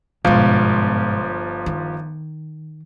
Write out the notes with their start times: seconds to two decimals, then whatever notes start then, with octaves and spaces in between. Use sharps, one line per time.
0.25 G1 G#2 B2 F3 F5
1.66 D#3